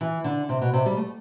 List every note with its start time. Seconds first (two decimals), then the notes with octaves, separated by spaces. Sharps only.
0.01 E3
0.24 D3
0.49 C3
0.61 B2
0.74 C3
0.86 G3
0.97 A3